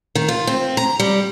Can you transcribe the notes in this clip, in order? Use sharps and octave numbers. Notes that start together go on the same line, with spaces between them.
D#3
F4
C4
A#5
G3